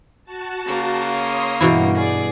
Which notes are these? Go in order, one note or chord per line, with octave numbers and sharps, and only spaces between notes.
F#4 A5
C#3 A#3
C#5 C6 D#6
G2 B2 E3 E4
G#4 D5